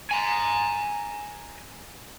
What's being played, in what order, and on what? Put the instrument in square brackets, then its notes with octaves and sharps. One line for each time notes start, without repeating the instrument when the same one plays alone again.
[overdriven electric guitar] G#5 A#5